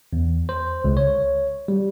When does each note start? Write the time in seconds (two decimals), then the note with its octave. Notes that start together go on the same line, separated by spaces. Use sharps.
0.13 E2
0.49 C5
0.84 C#2
0.97 C#5
1.68 G3